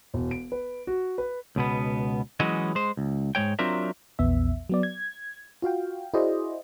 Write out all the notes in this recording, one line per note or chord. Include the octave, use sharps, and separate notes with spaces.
E1
D7
B4
F#4
B4
C#2 B2 B3
E3 F#3 G#3 C#4 F#4 D#5
G#3 C5
C#2
G#2 G#3 C#5 G5
F#3 C4 D4 F4 A#4 E5
A#1 E2 B3 E5
F#3 B3 D5
G#6
F4 F#4 F5 G5
E4 F#4 G#4 C5 D5 D#5